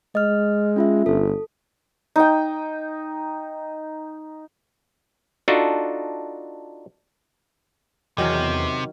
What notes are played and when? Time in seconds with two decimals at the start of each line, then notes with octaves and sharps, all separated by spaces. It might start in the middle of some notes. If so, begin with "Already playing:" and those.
0.15 G#3 D#5 F6
0.76 C#4 F4 E5
1.06 G1 A4
2.16 D#4 G5
5.48 D4 D#4 F4 F#4 A4
8.18 E2 C3 D#3 F#3 C#4